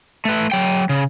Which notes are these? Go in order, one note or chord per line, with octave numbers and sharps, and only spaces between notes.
A3 B4
F#3 G5
C#3